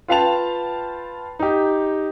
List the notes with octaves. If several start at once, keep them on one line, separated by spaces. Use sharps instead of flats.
F4 B4 F5 G5 A5 F7
D#4 G4